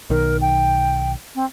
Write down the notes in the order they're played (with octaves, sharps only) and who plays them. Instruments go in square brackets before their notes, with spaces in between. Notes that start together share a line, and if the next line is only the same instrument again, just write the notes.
[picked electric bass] B1 D#3 [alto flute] A#4
[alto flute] G5
C4